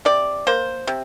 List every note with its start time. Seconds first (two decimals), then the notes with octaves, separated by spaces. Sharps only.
0.05 C3 D5
0.47 A#3 C5
0.87 C3